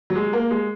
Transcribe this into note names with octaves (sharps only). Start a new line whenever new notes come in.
F#3
G#3
A#3
G#3